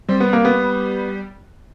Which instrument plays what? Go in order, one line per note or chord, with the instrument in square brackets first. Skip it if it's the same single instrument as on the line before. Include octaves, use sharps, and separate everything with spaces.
[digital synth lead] G3 [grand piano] C4
[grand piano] B3
A#3
B3